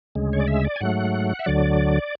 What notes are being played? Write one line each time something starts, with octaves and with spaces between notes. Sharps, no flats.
D2 C#3 G#3
C#5
D5
E5
D5
G#5
G#2 F#3 A3 F#5
E5
D2 D3 F#3 D5